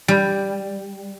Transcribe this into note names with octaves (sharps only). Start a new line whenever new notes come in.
G3